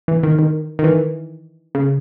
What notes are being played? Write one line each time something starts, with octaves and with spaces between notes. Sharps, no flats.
E3
D#3
D#3
D#3
E3
C#3